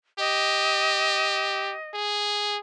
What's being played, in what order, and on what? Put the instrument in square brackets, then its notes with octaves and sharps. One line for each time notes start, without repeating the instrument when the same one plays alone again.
[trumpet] G4 [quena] D#5
[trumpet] G#4